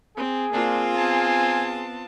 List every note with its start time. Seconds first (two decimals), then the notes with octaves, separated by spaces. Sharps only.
0.17 C4 G#4
0.53 A#3 C4 D4 F4
0.96 B3 G#5 A5